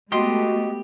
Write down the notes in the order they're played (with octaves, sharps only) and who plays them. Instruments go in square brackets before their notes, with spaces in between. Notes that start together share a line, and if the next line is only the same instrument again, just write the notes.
[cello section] G#3 A3 B3 [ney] F#4 [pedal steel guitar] G4 [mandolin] D#5 C6